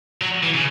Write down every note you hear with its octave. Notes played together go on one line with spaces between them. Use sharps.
F#3
E3
C#3